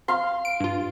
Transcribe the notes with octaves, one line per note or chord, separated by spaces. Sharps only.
F5 C6
D7
G2 F4